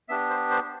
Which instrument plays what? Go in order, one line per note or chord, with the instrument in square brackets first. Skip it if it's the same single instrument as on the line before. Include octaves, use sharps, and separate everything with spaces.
[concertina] B3 D4 G4 E5
C5
C5